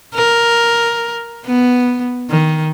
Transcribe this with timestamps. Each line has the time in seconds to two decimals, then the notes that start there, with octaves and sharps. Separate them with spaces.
0.15 A#4
1.46 B3
2.30 D#3